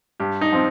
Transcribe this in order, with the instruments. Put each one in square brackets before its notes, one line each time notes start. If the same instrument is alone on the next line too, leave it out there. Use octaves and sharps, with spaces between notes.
[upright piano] G2 G4
D#4
F3 C4